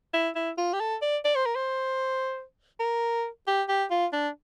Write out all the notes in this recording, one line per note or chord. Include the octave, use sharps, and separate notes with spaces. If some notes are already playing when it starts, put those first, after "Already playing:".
E4
E4
F4
G4
A4
D5
D5
C5
A#4
C5
A#4
G4
G4
F4
D4